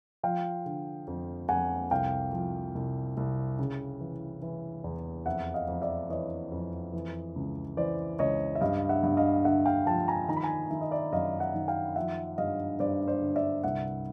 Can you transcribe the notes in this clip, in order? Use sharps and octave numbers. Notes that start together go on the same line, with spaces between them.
F3 F5 G5
D3
F2
F2 F#5 G#5
C2 F5 G5
F3
C2
C2
C#3
E3
E3
E2
F2 E5 F#5
D#5 F5
F2
D5 E5
E3 C#5 D#5
F2
E3
C#2
E3 C5 D5
C#2 C#5 D#5
E5
G2 D#5 F5
E5 F#5
G2
D#5 F5
D3 E5 F#5
F5 G5
F3 G5 A5
G#5 A#5
D#3 A#5
B5
G#5 A#5
D#3 E5
D#5
D5 E5
F#2 D#5 F5
E5 F#5
D#3
F5 G5
F3 E5 F#5
G2 D#5 F5
G2 C5 D5
C5 D5
D3
D5 E5
C2 E5 F#5